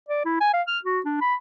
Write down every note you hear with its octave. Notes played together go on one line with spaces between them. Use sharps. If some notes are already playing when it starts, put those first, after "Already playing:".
D5
E4
G#5
F5
F6
F#4
D4
B5